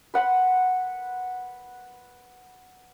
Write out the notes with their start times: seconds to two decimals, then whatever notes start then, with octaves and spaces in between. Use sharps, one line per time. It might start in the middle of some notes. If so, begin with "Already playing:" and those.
0.14 B4 F#5 B5 C6